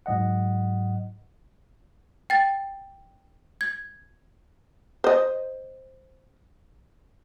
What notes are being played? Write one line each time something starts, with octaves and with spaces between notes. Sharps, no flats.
G#2 F#3 D#5 F#5
G5 A6
G#6
C5 D#5